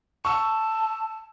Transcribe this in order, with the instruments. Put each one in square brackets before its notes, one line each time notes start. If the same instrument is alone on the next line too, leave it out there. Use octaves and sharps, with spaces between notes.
[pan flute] A5 [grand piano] C#6 E6